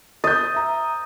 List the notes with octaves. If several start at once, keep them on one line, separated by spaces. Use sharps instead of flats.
D#5 G6 A6
E5 A#5